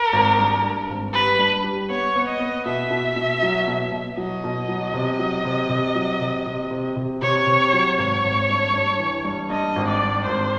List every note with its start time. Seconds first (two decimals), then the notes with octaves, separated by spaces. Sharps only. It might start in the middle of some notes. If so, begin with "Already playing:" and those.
Already playing: A#4
0.13 G#1
0.38 G2
0.63 G2
0.89 G#1
1.13 G3 B4
1.39 G2
1.64 G3
1.89 B3 C#5
2.16 B3
2.28 D#5
2.40 B3
2.66 B2 E5
2.91 B2
3.16 B2
3.42 F#3
3.68 B2
3.92 B2
4.17 F#3 D#5
4.44 B2
4.69 F#3
4.94 C3
5.19 F#3
5.45 C3
5.69 C3
5.95 F#3
6.21 C3
6.46 C3
6.71 C3
6.96 C3
7.22 C3 C#5
7.47 C3
7.73 F#3
7.98 G#1 C#5
8.24 G#1
8.49 G2
8.74 G2
8.99 E3
9.24 G2
9.50 G2 D#5
9.76 G#1
9.88 D5
10.01 G2
10.26 G#1 C5